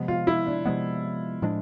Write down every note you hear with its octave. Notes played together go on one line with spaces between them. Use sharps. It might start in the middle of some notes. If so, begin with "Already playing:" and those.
Already playing: C3 F3 G#3 B3
F4
E4
D4
C3 F3 G#3 B3
A2 F3 G#3 D4